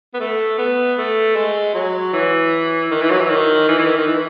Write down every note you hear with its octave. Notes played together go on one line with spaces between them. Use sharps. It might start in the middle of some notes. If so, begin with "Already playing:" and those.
B3
A3
B3
A3
G#3
F#3
E3
D#3
E3
F#3
E3
D#3
E3
E3
D#3
D#3
E3